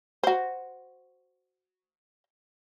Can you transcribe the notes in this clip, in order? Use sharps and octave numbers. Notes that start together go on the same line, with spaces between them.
F#4 C5